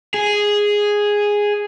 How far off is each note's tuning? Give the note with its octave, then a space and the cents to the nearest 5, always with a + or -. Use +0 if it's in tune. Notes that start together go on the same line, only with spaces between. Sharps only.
G#4 -5